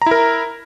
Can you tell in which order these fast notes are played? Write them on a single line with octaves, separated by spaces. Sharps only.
A#5 E4 A#4